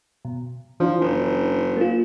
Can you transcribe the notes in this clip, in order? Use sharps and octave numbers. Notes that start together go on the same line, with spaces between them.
B2
E3 F3 D4
F#1
A#3 F4